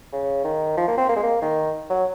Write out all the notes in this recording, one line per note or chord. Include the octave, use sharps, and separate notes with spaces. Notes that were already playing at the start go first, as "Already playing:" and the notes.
C#3
D#3
F3
A#3
C4
A#3
G#3
A#3
D#3
F#3